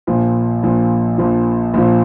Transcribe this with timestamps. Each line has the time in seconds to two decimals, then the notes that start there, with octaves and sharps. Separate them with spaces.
0.07 A#1 A#2 F3
0.63 A#1 A#2 F3
1.18 A#1 A#2 F3
1.74 A#1 A#2 F3